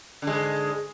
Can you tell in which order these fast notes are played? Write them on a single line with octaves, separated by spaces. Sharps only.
D3 G#3 G#2